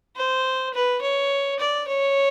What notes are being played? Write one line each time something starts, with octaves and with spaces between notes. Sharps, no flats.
C5
B4
C#5
D5
C#5